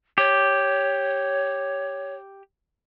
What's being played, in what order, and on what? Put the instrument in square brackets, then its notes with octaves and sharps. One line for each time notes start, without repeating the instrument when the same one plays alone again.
[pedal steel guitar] G4 [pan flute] C#5